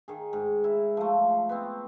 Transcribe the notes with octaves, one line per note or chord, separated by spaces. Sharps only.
D#3 G#4
G#2
E4
F3 A3
B3 C4